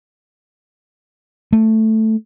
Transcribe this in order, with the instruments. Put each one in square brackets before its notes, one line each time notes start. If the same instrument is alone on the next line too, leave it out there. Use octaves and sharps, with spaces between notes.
[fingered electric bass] A3